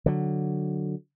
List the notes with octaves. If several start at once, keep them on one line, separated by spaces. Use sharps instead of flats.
D3 F#3